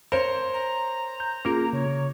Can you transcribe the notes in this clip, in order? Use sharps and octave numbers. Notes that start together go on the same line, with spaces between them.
A#4 C5 C#5
A#5
G6
A#3 C#4 F4 G#4 A#4
C#3 C#5